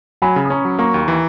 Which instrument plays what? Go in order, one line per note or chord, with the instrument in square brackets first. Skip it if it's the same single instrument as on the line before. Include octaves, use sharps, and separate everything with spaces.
[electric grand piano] F#3 [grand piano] G#5 B5
[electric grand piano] C#3
[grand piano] D#6
[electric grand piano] C#4 [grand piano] A#5 C#6
[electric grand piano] F#3
[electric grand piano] A#3 [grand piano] A#5 C#6
[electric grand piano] D#2
E3